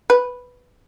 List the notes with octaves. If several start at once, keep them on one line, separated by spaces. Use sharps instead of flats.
B4